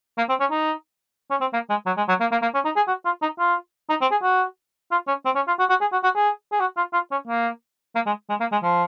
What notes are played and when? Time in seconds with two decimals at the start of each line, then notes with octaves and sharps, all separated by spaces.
0.18 A#3
0.29 C4
0.40 C#4
0.51 D#4
1.30 C#4
1.41 C4
1.53 A#3
1.70 G#3
1.86 F#3
1.97 G#3
2.08 F#3
2.21 A#3
2.32 A#3
2.42 A#3
2.54 C#4
2.65 D#4
2.76 G#4
2.88 F#4
3.05 F4
3.22 D#4
3.39 F4
3.90 D#4
4.01 C4
4.11 G#4
4.23 F#4
4.92 F4
5.08 C#4
5.25 C4
5.35 C#4
5.48 F4
5.59 F#4
5.70 F#4
5.81 G#4
5.92 F#4
6.04 F#4
6.15 G#4
6.52 G#4
6.60 F#4
6.77 F4
6.94 F4
7.11 C#4
7.28 A#3
7.95 A#3
8.06 G#3
8.30 G#3
8.40 A#3
8.52 G#3
8.63 F3